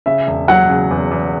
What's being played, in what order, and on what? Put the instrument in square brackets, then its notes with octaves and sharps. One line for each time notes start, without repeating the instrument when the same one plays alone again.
[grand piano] C#3 [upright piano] E5
[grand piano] E1
[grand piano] F#3 [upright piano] F#5
[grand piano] C#3
E2
E2